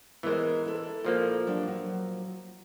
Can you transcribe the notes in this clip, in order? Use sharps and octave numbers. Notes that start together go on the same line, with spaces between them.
E3 G#3 B3 A#4 C5
E4 A4
A#2 F3 A#3
F#3 D4 G4
F#3